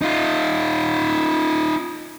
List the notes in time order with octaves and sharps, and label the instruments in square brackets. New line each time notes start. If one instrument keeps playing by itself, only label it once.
[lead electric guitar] D#4 F4